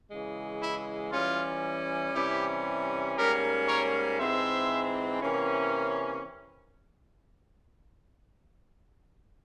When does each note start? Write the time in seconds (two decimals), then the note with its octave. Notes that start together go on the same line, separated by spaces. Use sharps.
0.09 C#3 E3 G#3
0.61 E4
1.12 E3 G3 C#4 F4
2.14 C3 E3 G3 C#4 E4 G4
3.16 G#2 G3 A#3 C#4 G4 A#4
3.67 A#4 C#5
4.19 G#2 E3 G#3 C4 C5 E5
5.21 C3 E3 A#3 C#4